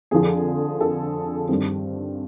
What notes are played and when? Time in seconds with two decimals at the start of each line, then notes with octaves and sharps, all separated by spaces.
0.11 F2 D3 F3 G#4
0.81 A4
1.49 G2 D#3 G3 C4